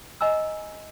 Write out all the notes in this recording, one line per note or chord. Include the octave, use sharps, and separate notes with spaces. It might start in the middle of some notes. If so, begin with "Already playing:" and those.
D#5 G#5 A#5 E6